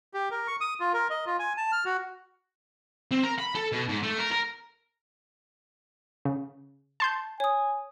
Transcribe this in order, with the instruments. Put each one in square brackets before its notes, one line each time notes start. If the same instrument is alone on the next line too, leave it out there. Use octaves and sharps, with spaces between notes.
[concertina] G4
A#4
C#6
D#6
F4
A#4
D#5
F4
G#5
A5
F6
F#4
[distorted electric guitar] C4
A#4
B5
A4
B2
G#2
A3
A#4
A#4
[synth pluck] C#3
A5 C6 G6
[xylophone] C#5 D#6 [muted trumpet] G#5